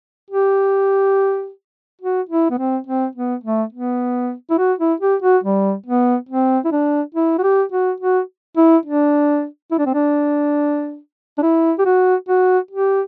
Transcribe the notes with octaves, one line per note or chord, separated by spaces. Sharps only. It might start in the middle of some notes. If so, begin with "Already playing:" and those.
G4
F#4
E4
B3
C4
C4
B3
A3
B3
E4
F#4
E4
G4
F#4
G3
B3
C4
E4
D4
E4
F#4
G4
F#4
F#4
E4
D4
E4
D4
C4
D4
D4
E4
G4
F#4
F#4
G4